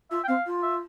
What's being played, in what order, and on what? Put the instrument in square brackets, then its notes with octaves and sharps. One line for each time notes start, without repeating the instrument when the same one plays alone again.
[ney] F4 [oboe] E5
[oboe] G5
[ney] C4 [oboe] F5
[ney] F4
[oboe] E5